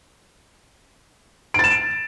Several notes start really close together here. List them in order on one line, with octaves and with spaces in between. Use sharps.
D7 A6 E7